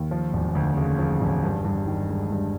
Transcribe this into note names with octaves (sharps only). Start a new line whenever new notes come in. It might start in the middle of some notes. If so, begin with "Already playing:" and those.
Already playing: D#2
F3
E1
D2
C#3
F3
E1
G2
G2
D#3
G#3
G2